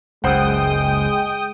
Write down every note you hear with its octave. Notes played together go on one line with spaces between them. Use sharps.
F#1 C#2 G#3 C5 F#5 G5 D#6